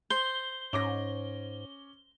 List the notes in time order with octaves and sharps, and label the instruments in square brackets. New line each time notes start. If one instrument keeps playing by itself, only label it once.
[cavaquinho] C5 [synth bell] G7
[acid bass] G#2 [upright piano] C#4 D6 A#6